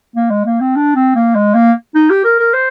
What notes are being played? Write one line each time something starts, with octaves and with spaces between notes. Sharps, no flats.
A#3
G#3
A#3
C4
D4
C4
A#3
G#3
A#3
D#4
G4
A#4
A#4
C5